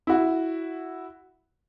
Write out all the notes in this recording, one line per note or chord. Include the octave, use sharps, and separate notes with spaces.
E4 F#4